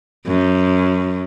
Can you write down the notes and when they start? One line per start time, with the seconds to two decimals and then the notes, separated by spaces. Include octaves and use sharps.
0.27 F#2